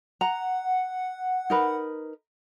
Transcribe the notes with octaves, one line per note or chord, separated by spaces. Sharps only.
F#5 A#5
D#4 A#4 B4